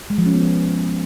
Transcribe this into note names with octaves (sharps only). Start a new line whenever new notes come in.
G#3
F3
C#4
B3
F3